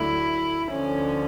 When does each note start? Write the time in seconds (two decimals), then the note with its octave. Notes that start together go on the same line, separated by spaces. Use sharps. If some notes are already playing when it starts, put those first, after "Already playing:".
Already playing: D2 D3 F#3 E4
0.70 D2 D3 F3 C#4